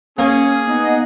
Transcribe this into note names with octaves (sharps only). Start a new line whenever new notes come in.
A#3 C#4 G#4
B3 D#4 D#5 F#5